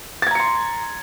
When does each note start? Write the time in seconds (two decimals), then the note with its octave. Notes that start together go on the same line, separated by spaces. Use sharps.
0.22 A6
0.27 G#6
0.31 A#5
0.35 C#7
0.40 C6